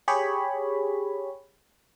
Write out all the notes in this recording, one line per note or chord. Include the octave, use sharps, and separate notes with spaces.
G4 G#4 C#5 B5